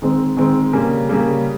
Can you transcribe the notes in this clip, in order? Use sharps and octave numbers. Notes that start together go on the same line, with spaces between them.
D#3 G#3 C4
D#3 G#3 C4
C#3 G3 A#3
C#3 G3 A#3